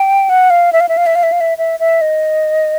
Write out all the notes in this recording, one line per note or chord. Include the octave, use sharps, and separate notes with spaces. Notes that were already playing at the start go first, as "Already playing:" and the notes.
Already playing: G5
F#5
F5
E5
F5
E5
F5
E5
F5
E5
F5
E5
E5
E5
D#5